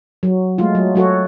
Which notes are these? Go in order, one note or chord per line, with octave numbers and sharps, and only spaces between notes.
F#3
G#3 A3 F4
F#3
F#3 F#4 A4 C#5